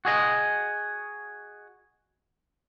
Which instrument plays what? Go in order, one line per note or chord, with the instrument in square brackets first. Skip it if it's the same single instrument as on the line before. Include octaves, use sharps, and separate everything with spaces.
[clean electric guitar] F#4 G#4 D#5